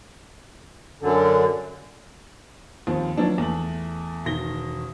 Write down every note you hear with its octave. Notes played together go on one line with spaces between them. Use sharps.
F#2 D3
D#2 F3 C4
F3 F#3 B3 D4 D#4
E2 A3 F#7
E1 D#3 A#6 G7